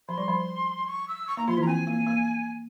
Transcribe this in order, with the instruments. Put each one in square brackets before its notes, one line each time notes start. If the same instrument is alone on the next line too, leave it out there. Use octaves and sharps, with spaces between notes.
[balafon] F3 [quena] C6
[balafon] G3
F3
[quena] C#6
E6
C#6
[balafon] A#3 [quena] A#5
[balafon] F3 F4 [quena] C6
[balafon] E3 E4 [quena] A#5
[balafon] C4 [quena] G#5
[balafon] A#3
A#3